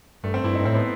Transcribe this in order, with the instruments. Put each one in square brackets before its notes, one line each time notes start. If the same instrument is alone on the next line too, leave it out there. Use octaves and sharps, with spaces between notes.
[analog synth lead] G2 [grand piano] A3
[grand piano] C4
[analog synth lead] G2 [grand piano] E4
[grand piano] D#4
[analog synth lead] G2
[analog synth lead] A2 [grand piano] C4
[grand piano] B3